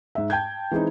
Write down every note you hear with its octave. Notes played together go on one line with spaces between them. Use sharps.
G#2 E5
G5 A5 G6 G#6
E3 G#3 C4 D#4